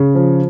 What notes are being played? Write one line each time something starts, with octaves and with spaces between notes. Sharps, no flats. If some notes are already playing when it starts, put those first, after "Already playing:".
Already playing: C#3
F3